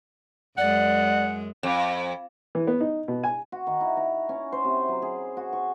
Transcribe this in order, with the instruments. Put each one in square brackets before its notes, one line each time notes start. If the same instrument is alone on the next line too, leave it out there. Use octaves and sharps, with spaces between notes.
[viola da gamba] F#2 G#3 [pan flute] D5 [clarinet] F#5
[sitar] F2
[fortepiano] E3
B3
D#4
B2
G#5
[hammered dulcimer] F#4
D#3
E4
A#5
C#4
C5
C3
F#3
G#4
F#4
C#6